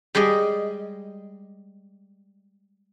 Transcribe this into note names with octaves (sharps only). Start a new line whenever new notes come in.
G3 G#3 D5 D#5